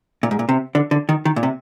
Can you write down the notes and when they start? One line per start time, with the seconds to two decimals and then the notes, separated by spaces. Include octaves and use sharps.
0.23 A#2
0.31 G#2
0.39 A#2
0.49 C3
0.75 D3
0.91 D3
1.09 D#3
1.25 D#3
1.36 A#2
1.43 C3